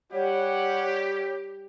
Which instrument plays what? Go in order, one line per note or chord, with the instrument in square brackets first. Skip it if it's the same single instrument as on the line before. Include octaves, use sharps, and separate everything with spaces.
[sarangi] G3 [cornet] G4 [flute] C#5 [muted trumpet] F#5